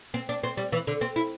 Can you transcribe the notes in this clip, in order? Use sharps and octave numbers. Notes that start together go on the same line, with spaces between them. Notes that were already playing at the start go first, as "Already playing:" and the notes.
C4
D4
C4
G3
E3
D3
C4
E4